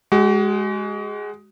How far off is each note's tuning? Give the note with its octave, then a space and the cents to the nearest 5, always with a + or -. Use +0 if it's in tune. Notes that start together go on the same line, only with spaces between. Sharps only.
G#3 +0 F#4 +40